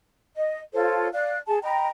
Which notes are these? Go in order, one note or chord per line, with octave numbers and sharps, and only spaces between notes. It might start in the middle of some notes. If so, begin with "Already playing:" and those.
D#5
F4 A4 C5 C#5
D5 F5 F#6
G#4 A5
D#5 G5 A#5 B5